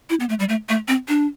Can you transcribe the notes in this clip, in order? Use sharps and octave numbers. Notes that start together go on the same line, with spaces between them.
E4
B3
A3
G3
A3
A3
C4
D4